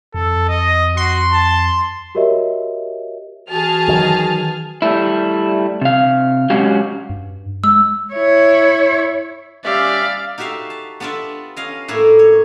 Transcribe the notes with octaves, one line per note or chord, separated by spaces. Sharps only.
F2 A4
D#5
F#4 C6
A5
F#4 G4 A#4 C#5 D#5 E5
E3 F#4 G#4 A5 F6
D#3 F#3
G3 A3 E4
C3 F5
F#3 G#3 C#4 F#4 G4 F5
G2
G#3 E6
E4 C#5
G3 C#4 G4 D5 E5 F5
D#4 F#4 G4 E5 F5
A5
B3 D4 F4 D5 E5
C#4 D#5 F5
A2 A#3 E4
C#5